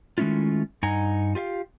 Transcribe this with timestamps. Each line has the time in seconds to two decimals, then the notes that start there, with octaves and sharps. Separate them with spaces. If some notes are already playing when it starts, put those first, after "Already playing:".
0.18 D#3 G#3 A3 C#4 E4 F4
0.83 G2 D#4 D#5 F#5 G#5 A#5
1.35 F4 G4 E5 F5